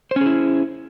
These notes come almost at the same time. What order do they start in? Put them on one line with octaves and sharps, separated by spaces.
C5 C#4 G#4 E4